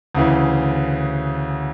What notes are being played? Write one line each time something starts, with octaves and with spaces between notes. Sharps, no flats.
D2 C#3 E3